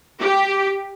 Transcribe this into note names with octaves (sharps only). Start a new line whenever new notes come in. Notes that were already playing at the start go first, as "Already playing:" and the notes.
G4